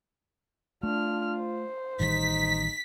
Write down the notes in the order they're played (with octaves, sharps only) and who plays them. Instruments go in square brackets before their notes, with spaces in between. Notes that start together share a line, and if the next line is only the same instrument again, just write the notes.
[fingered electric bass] A3 [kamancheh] D4 F6 [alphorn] F4
[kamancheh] C5
[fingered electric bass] A1 D#3 G3 [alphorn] D#4 [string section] B6